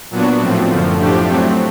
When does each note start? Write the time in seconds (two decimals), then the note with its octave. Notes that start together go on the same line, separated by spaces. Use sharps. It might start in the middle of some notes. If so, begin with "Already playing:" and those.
0.10 A#2 F#3 B3 D4 F#4
0.40 A2 F3 A3 C4
0.69 F#2 D3 F3
0.98 A2 F3 A3 D4 G4
1.27 F#3 A3 C4